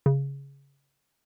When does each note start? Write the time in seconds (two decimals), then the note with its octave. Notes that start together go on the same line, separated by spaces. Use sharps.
0.06 C#3